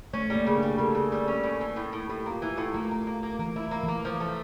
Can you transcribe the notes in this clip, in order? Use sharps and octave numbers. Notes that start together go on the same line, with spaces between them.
A3 C#4
G3
A#3
C#3
G3 D4
A#4
C#3 A4
C#3
G3
C#4
A2
E3
A2
A2
A2 G4
A#3
F4
E3
F4
A2
A3 A#3
A#3
A#3
A#3
E3 A#3
E4
A#3
E3 A#3
F3
A3